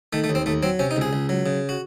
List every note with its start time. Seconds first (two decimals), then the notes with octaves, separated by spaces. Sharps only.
0.13 D#3 A3
0.24 A3
0.29 D#2
0.35 C4
0.46 D#2 A3
0.63 F#3 C4
0.79 C3 C#4
0.91 D#4
0.96 C#2
1.01 G#4
1.13 C#2
1.29 F#3
1.46 C#3
1.69 F#4